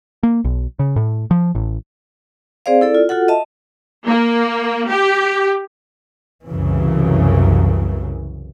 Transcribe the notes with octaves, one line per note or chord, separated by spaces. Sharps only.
A#3
B1
C#3
A2
F3
A1
C4 G#4 C5 D5 F5
E4 A4 D5
F4
F4 F#4 A4 F#5
D#5 E5 A5
A#3
G4
C2 F#2 C#3 E3